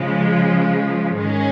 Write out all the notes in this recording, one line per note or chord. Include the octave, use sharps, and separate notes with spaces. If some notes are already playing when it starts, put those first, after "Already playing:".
Already playing: C#3 F3 G#3
G#2 D#3 G#3 C#4 G#4